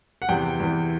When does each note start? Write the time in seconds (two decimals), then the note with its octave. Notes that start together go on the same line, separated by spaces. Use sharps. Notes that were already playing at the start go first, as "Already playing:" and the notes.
0.22 F#5
0.29 E2 C3 E3 G5
0.60 E2 C3 E3